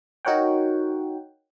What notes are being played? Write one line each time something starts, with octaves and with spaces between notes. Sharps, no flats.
D#4 F#4 A#4 C#5 F#5 G5